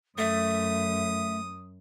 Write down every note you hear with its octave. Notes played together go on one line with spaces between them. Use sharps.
F#2 A3 E5 D#6